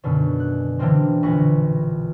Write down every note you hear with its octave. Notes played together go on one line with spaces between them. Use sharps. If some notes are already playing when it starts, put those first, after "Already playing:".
F#2 B2 D3 D#3
F#6
D3 E3 G3 A#3 C4
A#1 B4 C#6 A#6